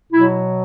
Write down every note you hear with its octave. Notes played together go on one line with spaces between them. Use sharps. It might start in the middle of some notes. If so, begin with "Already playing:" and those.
B2 F#3 E4